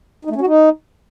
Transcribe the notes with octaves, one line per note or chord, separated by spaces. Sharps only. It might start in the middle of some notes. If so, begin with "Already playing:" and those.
D#4
A3
C#4
F#4
D#4